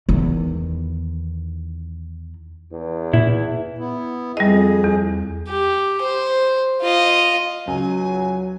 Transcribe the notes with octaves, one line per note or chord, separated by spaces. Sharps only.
E2 D#3
E2
A#2 E4
B3 E4
F2 G3 G#4 D#5
E2
G4
C5
F4 D#5
C#2 F#3 G#5